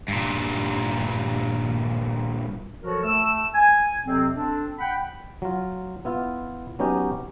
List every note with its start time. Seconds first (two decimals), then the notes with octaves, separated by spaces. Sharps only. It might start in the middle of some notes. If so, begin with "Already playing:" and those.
0.08 G2 A#2
2.83 F3 F#3 F#4 A4 A#4 C#5
3.04 A3 E6
3.54 G#5
4.04 F2 C3 F#3 C4
4.34 C4 D4 A4
4.79 F#5 G5 B5
5.42 F#3 F4
6.05 B3 E4 F4
6.79 F#3 B3 C#4 D#4 G4